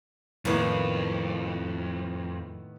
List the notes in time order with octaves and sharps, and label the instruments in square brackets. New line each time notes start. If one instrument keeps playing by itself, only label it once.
[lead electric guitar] F2 [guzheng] A2 A#3 [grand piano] D#3 B3 E4